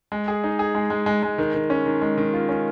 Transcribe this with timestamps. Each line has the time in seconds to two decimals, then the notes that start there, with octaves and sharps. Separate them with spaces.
0.12 G#3
0.28 G#4
0.44 D#4
0.59 G#4
0.75 G#3
0.90 G#3
1.06 G#3
1.23 G#3
1.38 D#3
1.54 D#3
1.70 C#4
1.86 D#3
2.02 G#3
2.18 D#3
2.33 F4
2.49 C#4